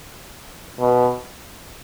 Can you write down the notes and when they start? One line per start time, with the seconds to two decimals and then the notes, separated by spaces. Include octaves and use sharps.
0.80 B2